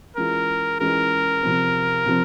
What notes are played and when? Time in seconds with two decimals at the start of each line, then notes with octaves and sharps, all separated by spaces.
0.17 E3 G#3 C#4 F4 A#4
0.80 E3 G#3 C#4 F4 A#4
1.42 C3 F3 C4
2.05 C3 F3 C4